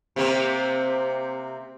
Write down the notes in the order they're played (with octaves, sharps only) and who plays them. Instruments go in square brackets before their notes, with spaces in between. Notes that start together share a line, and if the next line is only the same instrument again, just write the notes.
[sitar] C3 A#3 C4